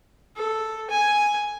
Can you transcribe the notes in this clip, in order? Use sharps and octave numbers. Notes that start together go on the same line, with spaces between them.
A4
G#5